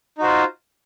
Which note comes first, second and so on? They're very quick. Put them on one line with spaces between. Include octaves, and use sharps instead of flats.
D#4 F#4 C5 F4